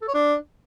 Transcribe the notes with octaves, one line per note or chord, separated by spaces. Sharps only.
A4
C#5
D4